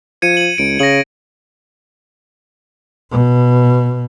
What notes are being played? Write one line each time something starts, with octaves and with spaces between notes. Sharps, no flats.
F3 G#6 C#7 D#7
D#7 F#7
C#2 D7
C#3 A#6 F#7
B2